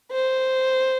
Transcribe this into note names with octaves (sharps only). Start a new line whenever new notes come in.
C5